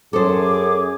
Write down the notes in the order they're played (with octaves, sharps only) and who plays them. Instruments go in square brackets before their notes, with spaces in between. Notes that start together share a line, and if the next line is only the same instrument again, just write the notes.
[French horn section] F#2 [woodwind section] G#4 [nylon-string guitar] A4 C5 [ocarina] D6